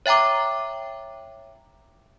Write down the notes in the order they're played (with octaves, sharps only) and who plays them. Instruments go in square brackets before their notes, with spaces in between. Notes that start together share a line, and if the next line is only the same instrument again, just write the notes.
[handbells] C#5 E5 G5 A#5 D6